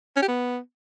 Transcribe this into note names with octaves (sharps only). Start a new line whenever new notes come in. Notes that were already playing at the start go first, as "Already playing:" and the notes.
C#4
G4
B3